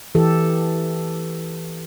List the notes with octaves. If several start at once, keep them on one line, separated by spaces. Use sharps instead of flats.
E3 G4 A4